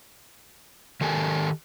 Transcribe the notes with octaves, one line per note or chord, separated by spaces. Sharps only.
D#3 G4 A4 A#4 G#5